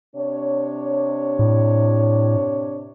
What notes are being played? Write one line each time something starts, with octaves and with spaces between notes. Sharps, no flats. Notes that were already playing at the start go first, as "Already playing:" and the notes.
C3 D4 C#5
A2